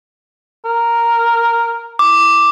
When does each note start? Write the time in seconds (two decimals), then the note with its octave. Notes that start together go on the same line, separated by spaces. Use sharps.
0.65 A#4
1.99 D6